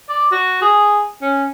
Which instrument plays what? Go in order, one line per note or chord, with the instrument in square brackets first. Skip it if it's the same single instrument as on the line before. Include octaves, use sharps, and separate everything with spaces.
[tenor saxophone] D5
F#4
G#4
C#4